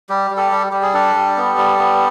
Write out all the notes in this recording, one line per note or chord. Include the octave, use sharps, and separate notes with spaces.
G3 G4
G3
G4 A4
G3
G3 G4
G#4
D4 G4 A4
G3
B3
G3
B3